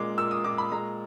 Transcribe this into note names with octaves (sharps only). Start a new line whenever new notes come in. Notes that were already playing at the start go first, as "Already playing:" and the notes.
Already playing: A#2 G#3 D6
A#2 E6
D#6
A#2 D6
B5
G#3 A#5